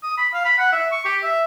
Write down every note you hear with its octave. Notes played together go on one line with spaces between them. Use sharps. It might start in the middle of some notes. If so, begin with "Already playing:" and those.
D#6
B5
F5
B5
F#5
E5
C#6
G4
E5